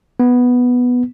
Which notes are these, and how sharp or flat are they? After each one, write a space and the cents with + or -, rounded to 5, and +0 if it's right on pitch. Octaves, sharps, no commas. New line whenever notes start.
B3 +0